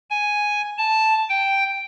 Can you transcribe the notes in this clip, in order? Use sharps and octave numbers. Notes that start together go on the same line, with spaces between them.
G#5
A5
G5